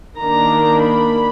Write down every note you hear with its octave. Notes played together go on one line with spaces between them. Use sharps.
D#3 A#3 D4 A#5
B5